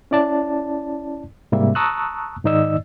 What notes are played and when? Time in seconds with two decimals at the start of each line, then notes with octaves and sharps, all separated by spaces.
0.11 C#4 E4 D5 A5
1.52 G#2 C3 G3 A#3 E5
1.75 A5 A#5 C#6 D#6 E6 F#6
2.45 G#2 D#3 D#4 D5 D#5 E6